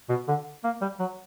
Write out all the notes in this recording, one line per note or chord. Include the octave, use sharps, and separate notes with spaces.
B2
D3
A#3
G3
F#3